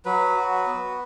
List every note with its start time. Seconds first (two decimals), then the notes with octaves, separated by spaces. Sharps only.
0.05 F#3 B4
0.36 F#4
0.66 B3